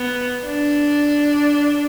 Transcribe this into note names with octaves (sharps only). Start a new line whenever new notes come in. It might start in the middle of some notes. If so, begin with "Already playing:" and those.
Already playing: B3
D4